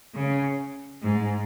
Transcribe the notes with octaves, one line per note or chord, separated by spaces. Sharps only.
C#3
G#2